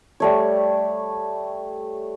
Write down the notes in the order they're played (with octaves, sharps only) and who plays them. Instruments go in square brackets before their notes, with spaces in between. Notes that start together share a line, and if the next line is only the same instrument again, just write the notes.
[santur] G3 A3 C#5